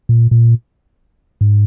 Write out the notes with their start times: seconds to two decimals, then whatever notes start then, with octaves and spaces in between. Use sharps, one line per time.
0.09 A#2
0.31 A#2
1.41 G#2